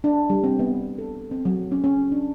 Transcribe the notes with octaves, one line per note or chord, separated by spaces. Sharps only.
D4
G3
C4
B3
A4
C4
F#3
C#4
C#4
D4